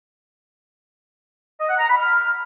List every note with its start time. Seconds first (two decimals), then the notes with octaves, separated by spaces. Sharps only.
1.60 D#5
1.69 F#5
1.79 A#5
1.89 B5
1.98 F6